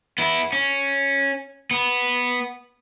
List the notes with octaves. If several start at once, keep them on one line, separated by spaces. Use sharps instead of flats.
B3 E4
C#4
B3